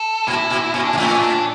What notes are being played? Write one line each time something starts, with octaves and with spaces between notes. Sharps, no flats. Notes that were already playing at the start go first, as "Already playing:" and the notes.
Already playing: A4
A#2 E4
A#2
A#2 C#4
D4
A#2
A2 C#4
D4